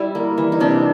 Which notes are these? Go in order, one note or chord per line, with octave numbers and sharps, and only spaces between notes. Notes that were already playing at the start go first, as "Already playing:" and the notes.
Already playing: G3 E4
A#3
E3
D#4
C3 D4